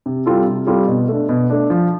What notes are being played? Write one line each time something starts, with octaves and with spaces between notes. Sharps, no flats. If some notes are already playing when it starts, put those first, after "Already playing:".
C3
G3 C4 F4 A4
C3
G3 C4 F4 A4
B2
A3 D4
B2
A3 D4
F3